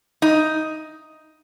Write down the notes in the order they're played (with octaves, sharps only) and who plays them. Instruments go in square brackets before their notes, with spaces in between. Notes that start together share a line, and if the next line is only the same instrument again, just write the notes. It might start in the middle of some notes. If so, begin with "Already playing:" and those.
[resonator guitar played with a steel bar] D#4